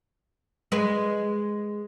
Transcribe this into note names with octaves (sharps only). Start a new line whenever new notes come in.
G#3 B4